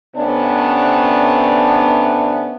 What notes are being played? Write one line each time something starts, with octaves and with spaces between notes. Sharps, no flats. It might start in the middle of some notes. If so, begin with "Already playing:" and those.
C3 A3 B3 C#4 D4